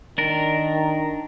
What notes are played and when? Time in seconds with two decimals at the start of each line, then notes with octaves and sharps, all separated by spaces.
0.18 D#3 D4 A#4